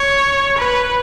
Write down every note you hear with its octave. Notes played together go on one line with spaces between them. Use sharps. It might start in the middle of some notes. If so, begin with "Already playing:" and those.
Already playing: C#5
B4